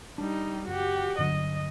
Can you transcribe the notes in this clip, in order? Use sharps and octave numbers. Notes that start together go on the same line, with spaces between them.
G3 D4 D#4
F#1 F#4 G4
G2 D3 F#3 D#5